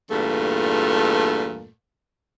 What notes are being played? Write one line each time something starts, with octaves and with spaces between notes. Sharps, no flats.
E2 G2 A#2 A3